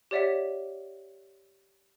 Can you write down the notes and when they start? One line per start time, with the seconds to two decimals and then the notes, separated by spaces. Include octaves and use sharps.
0.11 G4 C#5 D5 E5 F#5 B6